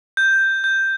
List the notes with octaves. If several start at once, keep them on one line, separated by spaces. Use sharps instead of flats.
G6
G6